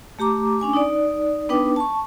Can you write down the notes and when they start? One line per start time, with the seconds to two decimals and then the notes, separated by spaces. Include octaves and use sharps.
0.19 A3 G4 A#5 D6
0.60 C#4 D4 G#5 D6
0.73 D#4 D5
1.49 B3 D4 D#4 B4 G5 D6
1.76 A5 C#6